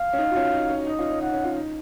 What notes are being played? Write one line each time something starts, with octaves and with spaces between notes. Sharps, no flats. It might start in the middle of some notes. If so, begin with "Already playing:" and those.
Already playing: F5
C#4
D#4
F#4
C#4 F4
D#4
C#4
D#4 D#5
C#4 F4
C#4
D#4 F#5
C#4
C#4 F4
D#4